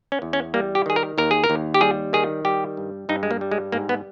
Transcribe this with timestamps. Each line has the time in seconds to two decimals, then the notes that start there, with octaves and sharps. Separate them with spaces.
0.12 C#4
0.22 E2
0.33 C#4
0.54 G3 A#3
0.75 G4
0.86 D#3 G#4
0.96 A#4
1.18 D#2 A#4
1.31 G#4
1.44 A#4
1.50 D#2
1.74 G4
1.81 G3 G#4
2.13 D#3 G#4
2.45 G3 G4
2.77 G2
3.09 G2 D#4
3.23 G#3
3.31 A#3
3.41 G3
3.52 G#3
3.72 G#2 A#3
3.89 B3